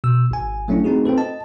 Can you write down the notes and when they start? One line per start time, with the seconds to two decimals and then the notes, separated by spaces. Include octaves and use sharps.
0.04 B2 E6
0.31 G#1 G#5
0.68 F#3 A3 C#4 D4 E4
0.84 A3 C4 D#4 F#4 G#4
1.05 C4 F4 A4 B4
1.18 D#5 A5